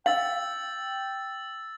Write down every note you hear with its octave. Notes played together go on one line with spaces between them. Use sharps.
F5 G5 E6 A6 F#7